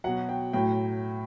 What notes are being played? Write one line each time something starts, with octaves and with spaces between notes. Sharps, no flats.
B2 F#3 F#5
G5
A2 F#3 G5